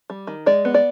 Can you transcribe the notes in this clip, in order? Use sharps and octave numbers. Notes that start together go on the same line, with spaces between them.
G3
D#3
G#3 D5
B3
D5